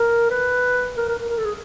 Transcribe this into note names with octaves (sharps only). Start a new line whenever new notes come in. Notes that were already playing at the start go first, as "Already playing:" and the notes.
Already playing: A#4
B4
A#4
A#4
A#4
A#4
A4
G#4